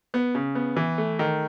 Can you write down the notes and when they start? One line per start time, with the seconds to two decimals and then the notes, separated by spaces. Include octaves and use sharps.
0.14 B3
0.35 C#3
0.55 B3
0.77 E3
0.98 A3
1.19 D#3